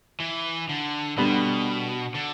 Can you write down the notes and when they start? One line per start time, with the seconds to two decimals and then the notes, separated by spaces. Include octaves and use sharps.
0.20 E3
0.70 D3
1.17 B2 D3 G3 B3
2.14 D3